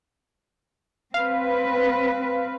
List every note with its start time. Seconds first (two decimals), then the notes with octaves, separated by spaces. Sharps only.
1.14 C4 B4 F5